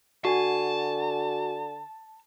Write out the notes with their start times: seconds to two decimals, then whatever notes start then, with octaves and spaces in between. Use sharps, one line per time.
0.25 D3 F#4 G#5 A5